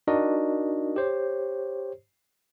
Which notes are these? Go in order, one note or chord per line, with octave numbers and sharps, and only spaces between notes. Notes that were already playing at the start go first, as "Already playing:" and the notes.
D4 D#4 F#4 A#4 D5 D#5
G4 C5 C#5